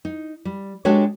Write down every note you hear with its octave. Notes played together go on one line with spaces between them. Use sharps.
D#4
G3
G#3 D4 F#4 G4 A4 C#5